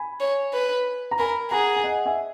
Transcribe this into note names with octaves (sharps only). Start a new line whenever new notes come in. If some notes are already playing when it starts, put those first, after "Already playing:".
Already playing: G#5 B5
C#5
B4
A#5
A#4 G#5 B5
G#4 F#5 A#5
G#5
D#5 F#5
E5 G#5